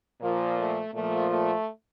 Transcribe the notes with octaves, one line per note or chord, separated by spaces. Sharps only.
A#2 F3 A#3
A3
A#2 F3 A3
A3